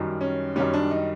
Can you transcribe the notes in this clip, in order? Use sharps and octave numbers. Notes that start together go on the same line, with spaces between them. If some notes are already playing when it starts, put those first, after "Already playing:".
Already playing: F#2 D#3 G3
C#4
F#2 D#3 G3 C#4
D4
D#4